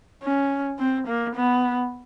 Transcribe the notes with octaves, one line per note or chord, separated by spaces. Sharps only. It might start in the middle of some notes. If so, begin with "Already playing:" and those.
C#4
C4
A#3
B3